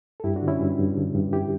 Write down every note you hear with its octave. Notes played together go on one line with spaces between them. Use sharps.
A4
G2 E4 G4
D4 F#4
D3
C#4 E4
G2
G2
D3
G2
E4 G4